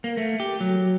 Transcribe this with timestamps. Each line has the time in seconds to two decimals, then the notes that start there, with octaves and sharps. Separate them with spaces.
0.04 A#3
0.17 A3
0.40 G4
0.61 F#3